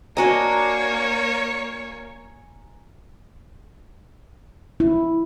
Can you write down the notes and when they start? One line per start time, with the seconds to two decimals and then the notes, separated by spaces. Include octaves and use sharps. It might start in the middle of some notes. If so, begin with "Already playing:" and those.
0.17 A#3 D4 F#4 C#5 D#5 G#5 A#5
4.80 E4